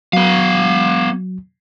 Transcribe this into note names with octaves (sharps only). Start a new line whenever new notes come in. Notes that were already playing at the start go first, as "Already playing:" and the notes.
F#3 B3 F5